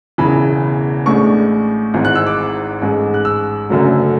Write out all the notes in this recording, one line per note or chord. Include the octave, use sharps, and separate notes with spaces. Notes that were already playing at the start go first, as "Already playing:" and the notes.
E1 E2 C#3 E3 B5
A1 A2 G#3 D4 C#6
G#1 G#2 E3 G#3
F#6
E6
D6
A1 G#2 G#3
F#6
E6
F#1 F#2 D3 F#3 A3